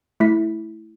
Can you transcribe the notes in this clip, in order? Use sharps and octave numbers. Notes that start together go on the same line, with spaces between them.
A3 E4 B6